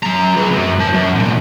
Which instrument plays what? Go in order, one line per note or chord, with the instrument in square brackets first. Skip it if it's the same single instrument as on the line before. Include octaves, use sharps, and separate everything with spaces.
[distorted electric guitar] F#2 A#5
D2 B4
F#2 F#3
E3 A5
F#2
E2 A#2